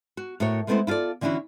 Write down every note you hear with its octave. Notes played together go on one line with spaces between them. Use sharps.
F#4
A2 F#4 A#4 C#5
G#3 A3 B3 C4 E4 C5
E4 F4 G#4 A4 D5
D3 E3 C#4 D4 E4 F#4